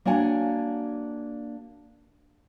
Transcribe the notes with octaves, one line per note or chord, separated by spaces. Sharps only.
A#3 D4 F#4 C#5 G#5